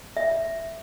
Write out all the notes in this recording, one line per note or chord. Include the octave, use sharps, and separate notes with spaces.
E5